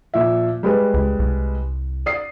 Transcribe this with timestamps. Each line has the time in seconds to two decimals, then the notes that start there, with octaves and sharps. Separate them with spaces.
0.14 A#2 F3 E5
0.63 G3 G#3 B4
0.94 C#2
1.19 C2
2.06 D5 D#6 C7